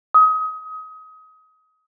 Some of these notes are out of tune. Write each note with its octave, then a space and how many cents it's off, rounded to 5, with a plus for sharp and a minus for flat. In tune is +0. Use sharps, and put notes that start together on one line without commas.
D#6 +25